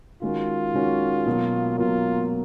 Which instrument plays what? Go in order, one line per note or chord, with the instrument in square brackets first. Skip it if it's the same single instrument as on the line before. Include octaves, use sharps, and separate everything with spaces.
[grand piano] D#3 G#3 C#4 F#4 A#4 [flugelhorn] F4
[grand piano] D#3 G#3 C#4 F#4 A#4
B2 F#3 A#3
[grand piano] B2 F#3 A#3 [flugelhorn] F4